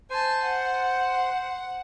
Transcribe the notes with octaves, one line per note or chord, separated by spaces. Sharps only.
C5 G#5 A5
F#5